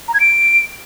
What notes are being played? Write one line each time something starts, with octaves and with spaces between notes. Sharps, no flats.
A#5
G#6
D7